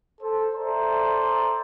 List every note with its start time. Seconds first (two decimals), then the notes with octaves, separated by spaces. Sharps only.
0.21 A4 C5
0.55 A4 C5 D5 E5 A#5